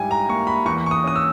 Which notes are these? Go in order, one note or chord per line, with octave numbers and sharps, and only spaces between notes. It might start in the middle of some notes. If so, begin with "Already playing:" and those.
Already playing: G#2 G3 E4 G5 G#5
A#5
A#3 C#6
B5
E2 C#6
C#6
D#6
C#4 D#6
E6